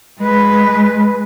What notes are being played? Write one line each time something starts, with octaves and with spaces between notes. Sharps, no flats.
G#3 B4